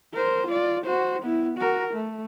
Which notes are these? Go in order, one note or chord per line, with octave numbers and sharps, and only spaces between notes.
A#4 C5
F4 D5
F#4 C5
B3 E4
F#4 A#4
A3